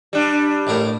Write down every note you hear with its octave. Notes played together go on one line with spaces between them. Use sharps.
G3 D4
A1 A2 A#4